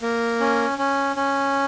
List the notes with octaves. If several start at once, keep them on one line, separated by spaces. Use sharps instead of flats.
A#3
C#4
C#4
C#4